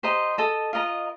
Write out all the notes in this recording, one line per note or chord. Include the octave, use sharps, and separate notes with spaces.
G4 C5 D#5 A#5
A4 D#5 A5
F4 A#4 D#5 A#5